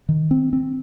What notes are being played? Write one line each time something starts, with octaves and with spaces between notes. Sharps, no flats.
D#3
C4
C4